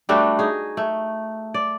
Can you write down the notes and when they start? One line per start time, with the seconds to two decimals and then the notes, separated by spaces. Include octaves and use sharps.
0.09 G3 A3 D4 F#4
0.39 D#4 G#4
0.77 A3
1.54 D5